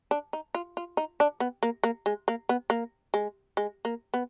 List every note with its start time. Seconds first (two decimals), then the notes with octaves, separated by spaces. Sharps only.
0.11 D4
0.33 D#4
0.55 F4
0.77 F4
0.97 D#4
1.20 D4
1.40 B3
1.63 A#3
1.84 A#3
2.06 G#3
2.28 A#3
2.49 B3
2.70 A#3
3.14 G#3
3.57 G#3
3.85 A#3
4.14 B3